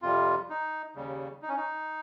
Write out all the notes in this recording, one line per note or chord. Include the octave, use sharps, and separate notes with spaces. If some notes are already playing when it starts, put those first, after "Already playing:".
F2 C3 G3 F4
D#4
D#2 C#3 G3
D#4
C#4
D#4